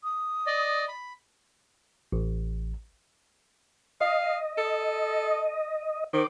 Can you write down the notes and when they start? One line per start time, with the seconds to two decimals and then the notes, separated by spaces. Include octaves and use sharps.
0.04 D#6
0.47 D5 D#5
0.88 B5
2.12 A1
4.01 D#5 F5
4.58 A4
6.13 D#3 C5 D6